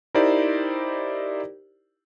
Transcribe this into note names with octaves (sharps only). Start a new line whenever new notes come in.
D#4 E4 G4 A#4 C5 D5